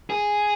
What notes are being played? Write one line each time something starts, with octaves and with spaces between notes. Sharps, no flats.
G#4